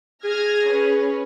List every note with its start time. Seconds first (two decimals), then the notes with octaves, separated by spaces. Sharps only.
0.24 G#4 F6 G#6 A#6
0.69 C#4 B4